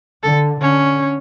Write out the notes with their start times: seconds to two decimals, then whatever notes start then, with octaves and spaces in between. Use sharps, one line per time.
0.23 D3 A4
0.61 D3 C#4